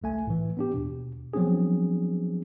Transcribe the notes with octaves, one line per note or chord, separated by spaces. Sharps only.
G1 C2 A3 G#5
A2 E3
B3 D4 G4
D#2 B2
F3 F#3 B3 C4 D4 G#4